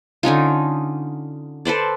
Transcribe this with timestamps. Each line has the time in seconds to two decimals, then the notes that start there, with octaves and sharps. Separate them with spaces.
0.23 D3 C#4 D#4 F4
1.65 A4 B4 C5 D5